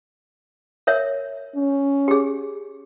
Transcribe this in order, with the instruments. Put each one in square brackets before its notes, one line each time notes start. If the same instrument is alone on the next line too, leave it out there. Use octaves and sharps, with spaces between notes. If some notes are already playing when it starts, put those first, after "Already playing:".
[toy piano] A#4 C#5 E5
[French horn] C#4
[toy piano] G4 G#4